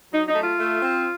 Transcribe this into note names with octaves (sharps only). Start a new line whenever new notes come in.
F#3 D#4
D#4
A3
F4
A3
C4